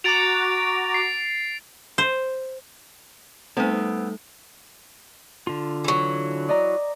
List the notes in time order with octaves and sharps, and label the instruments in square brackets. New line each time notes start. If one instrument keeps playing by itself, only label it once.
[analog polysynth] F#4 A#5 D6 [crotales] A6 D7 F7
[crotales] C7
[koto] C5
[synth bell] G3 D#4 [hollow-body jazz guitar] A3 [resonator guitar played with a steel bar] B3 C4
[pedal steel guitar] D3 F4
[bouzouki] E3 F#3
[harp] D5 D#5 A#5